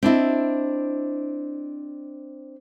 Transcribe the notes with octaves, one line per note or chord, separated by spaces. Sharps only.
C4 D4 E4 D#5